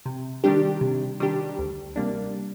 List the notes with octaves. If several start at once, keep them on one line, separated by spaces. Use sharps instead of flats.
C3
D#3 G3 D4 G4
C3
D#3 G3 D4 G4
D2
C3 G3 A#3 D4